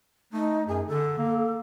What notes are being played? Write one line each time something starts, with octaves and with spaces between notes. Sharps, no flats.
A3 D#4
F#2 G#4
D3 A4
A#3